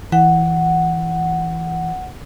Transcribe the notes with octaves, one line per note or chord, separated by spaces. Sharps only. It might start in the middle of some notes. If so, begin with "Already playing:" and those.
E3 F#5